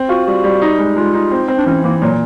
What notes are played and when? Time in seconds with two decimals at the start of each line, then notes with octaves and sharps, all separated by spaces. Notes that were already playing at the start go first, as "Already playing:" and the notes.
Already playing: C4
0.09 F4 F#4
0.26 G3 F#4
0.44 G3
0.62 D#4
0.79 G#3
0.96 G#3 F4
1.14 D#4
1.31 C4
1.48 C4
1.58 D4
1.66 E3 C#4
1.83 E3 A#3
2.02 A#2 F#3